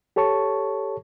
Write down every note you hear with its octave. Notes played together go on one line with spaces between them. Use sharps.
G4 A4 C#5 A5 C#6